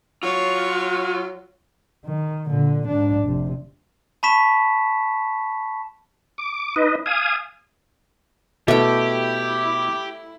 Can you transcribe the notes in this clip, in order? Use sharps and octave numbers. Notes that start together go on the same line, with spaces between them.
F#3 F4 C#5
D#3
A#2 D3
G#2 D4
F1 C3
A5 B5 C#6 B6 E7
D6
D#4 B4 D#5
F5 G#5 D#6
B2 A3 E4 G4 G5